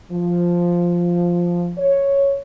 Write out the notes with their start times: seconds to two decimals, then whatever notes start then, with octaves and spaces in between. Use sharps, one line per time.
0.12 F3
1.78 C#5